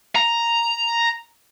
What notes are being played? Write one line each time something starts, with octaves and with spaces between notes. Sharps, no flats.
A#5